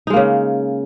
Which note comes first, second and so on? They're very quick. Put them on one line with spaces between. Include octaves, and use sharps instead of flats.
D#4 G#3 A#3 C#3